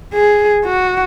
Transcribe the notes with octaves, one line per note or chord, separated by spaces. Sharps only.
G#4
F#4